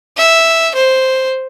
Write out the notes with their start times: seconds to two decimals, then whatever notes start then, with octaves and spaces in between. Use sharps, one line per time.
0.17 E5
0.75 C5